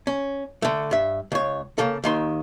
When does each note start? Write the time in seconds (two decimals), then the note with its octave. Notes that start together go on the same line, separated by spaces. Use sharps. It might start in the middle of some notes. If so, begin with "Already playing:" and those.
0.07 C#4
0.62 D3 A3
0.91 G2 E5
1.32 C#2 C#5
1.78 C#3 A#3 A4
2.04 D#2 D#3 C6